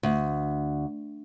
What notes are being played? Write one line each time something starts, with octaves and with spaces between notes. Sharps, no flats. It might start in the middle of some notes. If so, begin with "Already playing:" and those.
D2